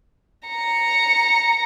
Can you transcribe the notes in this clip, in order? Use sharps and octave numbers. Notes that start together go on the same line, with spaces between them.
A#5 C#7